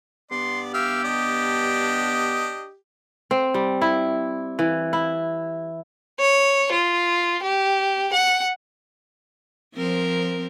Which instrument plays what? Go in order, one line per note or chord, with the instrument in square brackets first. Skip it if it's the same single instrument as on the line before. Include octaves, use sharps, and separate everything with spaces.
[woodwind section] G2 B3 [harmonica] D5 [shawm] C6
[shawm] G4 [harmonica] E5 F5
[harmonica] D4 D#5
[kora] C4
G3
E4
E3
E4
[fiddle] C#5
F4
G4
F#5
[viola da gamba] F3 C4 A#4